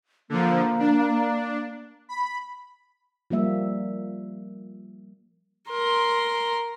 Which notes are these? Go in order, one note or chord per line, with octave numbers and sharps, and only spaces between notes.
D3 F3 A#3
D4
B5
F3 G3 A#3 E5
A#4 C6